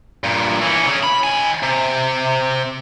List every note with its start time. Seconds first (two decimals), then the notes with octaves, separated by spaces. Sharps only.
0.24 G2 A#2
0.62 E3 C#4
0.87 C#3 C#4
1.03 B5
1.24 D#3 G#5
1.63 C3